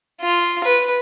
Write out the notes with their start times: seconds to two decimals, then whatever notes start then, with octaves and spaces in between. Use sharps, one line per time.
0.21 F4
0.64 B4